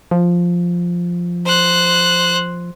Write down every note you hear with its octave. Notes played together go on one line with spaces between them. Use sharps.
F3
C5 F#6